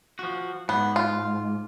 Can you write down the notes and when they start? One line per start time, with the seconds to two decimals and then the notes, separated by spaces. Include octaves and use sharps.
0.19 F3 F#4
0.69 G#2 B3
0.96 F4